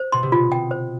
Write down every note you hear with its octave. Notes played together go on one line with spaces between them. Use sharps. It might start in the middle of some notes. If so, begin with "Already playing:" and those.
Already playing: C5
B2 C6
C3
B2 F4
B2 G5
C5